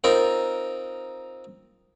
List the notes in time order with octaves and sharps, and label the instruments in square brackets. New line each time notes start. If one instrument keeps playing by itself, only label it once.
[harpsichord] C4 D#4 F4 A#4